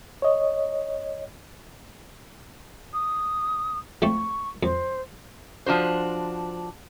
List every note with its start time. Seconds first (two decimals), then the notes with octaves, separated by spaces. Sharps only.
0.22 C#5 D#5
2.93 D#6
4.02 F3 A3 C4 C#6
4.63 F2 C5
5.66 F3 D4 F#4 C5